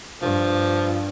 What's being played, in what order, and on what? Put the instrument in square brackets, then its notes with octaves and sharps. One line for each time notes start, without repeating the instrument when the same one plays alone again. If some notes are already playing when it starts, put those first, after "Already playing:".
[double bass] G2 [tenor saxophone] F3